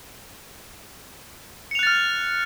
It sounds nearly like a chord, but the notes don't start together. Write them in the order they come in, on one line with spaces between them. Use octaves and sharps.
C#7 F7 F#6 A6 F6